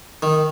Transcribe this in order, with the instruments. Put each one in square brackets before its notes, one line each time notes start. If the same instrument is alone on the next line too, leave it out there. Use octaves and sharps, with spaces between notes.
[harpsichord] D#3